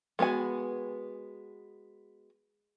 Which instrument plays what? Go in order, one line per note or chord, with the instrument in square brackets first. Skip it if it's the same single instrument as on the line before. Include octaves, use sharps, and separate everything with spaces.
[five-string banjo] G#3 B3 F#4 G#5